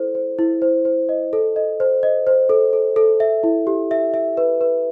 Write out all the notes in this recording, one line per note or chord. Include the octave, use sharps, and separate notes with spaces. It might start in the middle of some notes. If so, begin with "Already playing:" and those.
Already playing: E4 A4 C5
C5
E4
C5
C5
D#5
A4
D#5
C5
D#5
C5
A4
A4
A4
E5
E4
G4
E5
E5
B4
B4